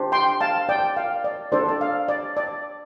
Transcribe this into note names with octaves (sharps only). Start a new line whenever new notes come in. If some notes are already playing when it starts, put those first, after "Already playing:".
Already playing: D4 G4 C5
G5 C6
F5 A5
D5 G5
F5
D5
D4 A4 C5 D5
D5
F5
D5
D5